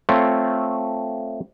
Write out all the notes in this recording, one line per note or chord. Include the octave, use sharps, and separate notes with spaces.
A3 C4 F4 C#5